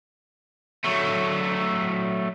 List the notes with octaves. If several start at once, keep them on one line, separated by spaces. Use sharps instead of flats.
F#3 A3